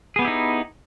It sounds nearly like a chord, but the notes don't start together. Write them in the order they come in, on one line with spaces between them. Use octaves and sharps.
G#4 B3 G4 E4 D#4